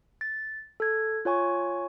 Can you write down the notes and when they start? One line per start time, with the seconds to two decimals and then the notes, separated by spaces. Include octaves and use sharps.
0.21 A6
0.80 A4 G#6
1.25 F4 C#5 G#5 C#6